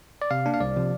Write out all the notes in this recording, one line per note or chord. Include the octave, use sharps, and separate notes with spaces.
D5
C3 F5
A#3 D4
F5
C2 D5
C3 F3